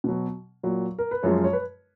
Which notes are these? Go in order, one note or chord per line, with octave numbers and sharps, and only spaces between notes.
B2 F#3
A#2 F#3
A#4
B4
F#2 F3 G#3 C#5
C#5
B4